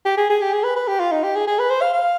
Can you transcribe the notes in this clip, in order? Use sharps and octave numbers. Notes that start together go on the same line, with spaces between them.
G4
G#4
G#4
G4
G#4
B4
B4
G4
F4
D#4
G4
G#4
G#4
B4
C5
F5
F5